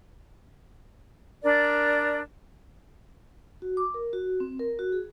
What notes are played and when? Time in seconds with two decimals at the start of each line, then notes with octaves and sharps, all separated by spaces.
1.43 D4 A#4 D5
3.62 F#4
3.77 D6
3.94 A#4
4.13 F#4
4.40 C4
4.59 A#4
4.79 F#4
4.92 G#4